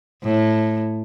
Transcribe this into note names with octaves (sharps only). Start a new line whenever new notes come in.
A2